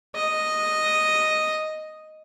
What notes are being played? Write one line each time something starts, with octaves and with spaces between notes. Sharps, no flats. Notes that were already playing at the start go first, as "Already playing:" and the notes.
D#5